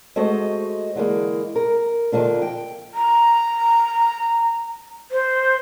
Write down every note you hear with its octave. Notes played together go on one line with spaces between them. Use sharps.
G#3 A3 F#4 C5 D#5
D3 E3 G#3 A#3
A#4
D3 D#3 F3 F#3 A#3 D4
G5
A#5
C5